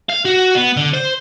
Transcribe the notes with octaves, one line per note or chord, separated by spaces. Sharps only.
F5
F#4
B3
D3
C5